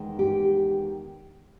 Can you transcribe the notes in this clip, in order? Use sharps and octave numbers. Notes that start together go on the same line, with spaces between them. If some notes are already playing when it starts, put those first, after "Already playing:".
Already playing: E2 D#3 G#3
G4